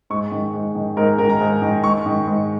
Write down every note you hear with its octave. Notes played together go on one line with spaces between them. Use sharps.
G#2 C#6
D#3
G#2
D#3
G#2 A#4
D#3 A#4
A#5
G#2
D#3
G#2 C#6
D#3
G#2